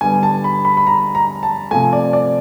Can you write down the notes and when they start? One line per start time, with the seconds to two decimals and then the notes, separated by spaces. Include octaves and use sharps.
0.01 D3 G3 B3 G#5
0.23 A5
0.44 B5
0.65 B5
0.77 B5
0.87 A#5
1.15 A#5
1.43 A5
1.71 C3 F3 A3 G#5
1.93 D5
2.13 D5